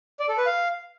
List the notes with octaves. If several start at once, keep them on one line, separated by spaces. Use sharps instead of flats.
D5
A4
B4
F5